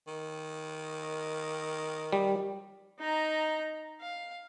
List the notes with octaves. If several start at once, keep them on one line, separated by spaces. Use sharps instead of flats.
D#3
G3
D#4 A#5
F5